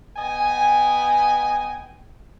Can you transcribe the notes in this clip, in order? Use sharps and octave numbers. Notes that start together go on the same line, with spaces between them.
B3 D#5 G5 G#5